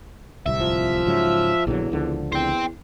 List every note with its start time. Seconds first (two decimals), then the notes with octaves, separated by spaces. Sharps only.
0.46 D1 C2 C3 E5
0.61 F3
1.07 G#2 C#3 F#3
1.67 A#1 E2 D3 F#3
1.92 C#2 D3 F3
2.32 E2 C5 G5